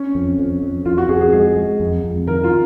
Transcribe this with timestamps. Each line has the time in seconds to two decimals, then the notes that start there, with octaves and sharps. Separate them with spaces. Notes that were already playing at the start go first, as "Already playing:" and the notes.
Already playing: C#4
0.15 F2
0.39 F2
0.62 F2
0.85 F2 F4
0.98 F#4
1.09 F2 G#4
1.21 G#4
1.32 G#3 G#4
1.56 G#3
1.80 F2
2.04 F2
2.27 D#3 A#4
2.44 F4